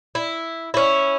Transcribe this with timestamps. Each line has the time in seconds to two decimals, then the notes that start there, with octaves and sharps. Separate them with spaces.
0.15 E4
0.74 C#4 E4